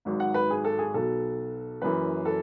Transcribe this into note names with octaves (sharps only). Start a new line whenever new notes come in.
G#1 G#2 F#3
F#5
B4
G#4
A4
G#4
B1 B2 F#3 A4
F#1 F#2 E3 B4
A4